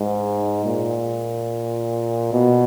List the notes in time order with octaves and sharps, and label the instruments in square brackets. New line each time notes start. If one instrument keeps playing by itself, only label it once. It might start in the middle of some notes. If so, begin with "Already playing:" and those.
Already playing: [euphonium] G#2
A#2
B2